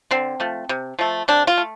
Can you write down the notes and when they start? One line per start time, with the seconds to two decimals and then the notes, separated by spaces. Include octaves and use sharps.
0.11 D3 C4
0.40 F3 A3
0.69 C3
0.99 F3 A3
1.28 C3 D4
1.47 F4
1.57 A3